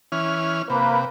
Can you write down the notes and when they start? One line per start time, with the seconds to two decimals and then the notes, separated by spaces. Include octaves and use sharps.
0.12 E3 C#4 F6
0.70 C3 A#3 B4